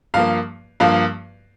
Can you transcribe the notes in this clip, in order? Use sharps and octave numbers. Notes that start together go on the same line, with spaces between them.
G2 F3 A#3 F5
G2 F3 A#3 F5